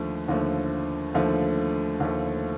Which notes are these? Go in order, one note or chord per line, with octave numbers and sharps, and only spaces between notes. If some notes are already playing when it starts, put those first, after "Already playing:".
Already playing: D#2 D3 F3 A3
D#2 D3 F3 A3
D#2 D3 F3 A3
D#2 D3 F3 A3